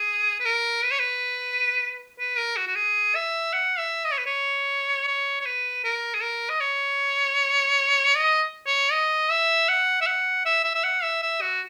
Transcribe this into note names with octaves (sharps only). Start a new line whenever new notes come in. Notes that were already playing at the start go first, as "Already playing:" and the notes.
Already playing: G#4
B4
A#4
B4
C#5
B4
B4
A#4
F#4
F#4
G#4
E5
F#5
E5
D#5
C#5
B4
C#5
C#5
C#5
B4
A#4
G#4
A#4
D#5
C#5
D#5
C#5
D#5
E5
F#5
E5
F#5
E5
E5
E5
F#5
E5
E5
F#4